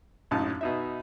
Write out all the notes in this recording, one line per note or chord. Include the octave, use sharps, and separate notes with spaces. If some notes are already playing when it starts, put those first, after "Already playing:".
A#1 F#2 A2 D#4 A5
B2 D#4 E5